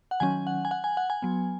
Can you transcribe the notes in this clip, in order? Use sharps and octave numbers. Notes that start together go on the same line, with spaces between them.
F#5
D#3 F#3 C#4 G#5
F#5
G#5
F#5
G#5
F#5
G#5
F#3 B3